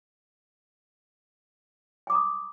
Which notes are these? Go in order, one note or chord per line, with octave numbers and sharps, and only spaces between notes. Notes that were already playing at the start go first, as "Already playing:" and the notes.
G#5 A#5 D6 D#6